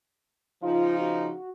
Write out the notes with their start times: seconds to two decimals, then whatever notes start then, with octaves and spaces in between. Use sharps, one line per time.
0.62 C#3 F3 D#4 F4
1.01 F#4